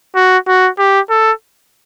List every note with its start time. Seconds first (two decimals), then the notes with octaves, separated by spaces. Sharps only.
0.15 F#4
0.47 F#4
0.78 G4
1.10 A4